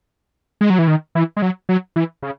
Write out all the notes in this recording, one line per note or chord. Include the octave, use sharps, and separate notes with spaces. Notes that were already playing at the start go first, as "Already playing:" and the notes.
G#3
F#3
E3
D#3
E3
G#3
F#3
F#3
E3
C#3